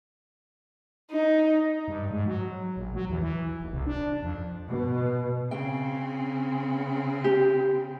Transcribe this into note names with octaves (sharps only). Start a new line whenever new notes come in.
D#4
G2
G#2
F#3
A#1
F#3
E2
E3
D#1
C2
D4
F2
B2
C#3 C4 G5
G4